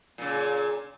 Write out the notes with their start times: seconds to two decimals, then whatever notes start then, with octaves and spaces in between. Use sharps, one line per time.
0.18 A#2 C#3